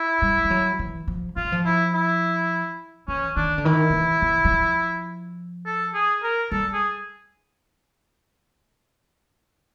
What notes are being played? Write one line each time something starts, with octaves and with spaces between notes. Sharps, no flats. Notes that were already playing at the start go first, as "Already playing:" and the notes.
Already playing: E4
G3
G3
F#3
E3
F3
F3 F4
F#3
F3
E4
E4
E3 C#4
D#3 D4
D3
D#3 E4
D#3
E3
E3
F#3
F3
A4
G#4
A#4
G3 A4
G#4